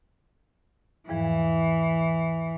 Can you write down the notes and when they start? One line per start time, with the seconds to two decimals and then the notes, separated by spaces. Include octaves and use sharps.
1.09 E2 G#2 E3 F3